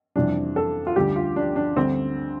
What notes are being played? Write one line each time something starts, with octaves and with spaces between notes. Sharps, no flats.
F2 C3 E3 G3 D4
A4
F4
D2 D3 G3 G4
F4
D4
D4
D2 D3 G3 C4